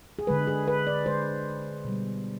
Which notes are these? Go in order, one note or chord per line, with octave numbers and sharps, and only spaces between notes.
G#4
D3 G#3 B4
G#4
B4
D5
D3 G#3 C5
B2 G3